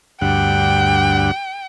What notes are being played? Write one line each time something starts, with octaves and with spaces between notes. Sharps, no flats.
D2 G2 F#5 G5